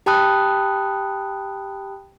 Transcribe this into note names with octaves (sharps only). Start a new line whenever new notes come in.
G4 G5 A5 B5 D#6 F#6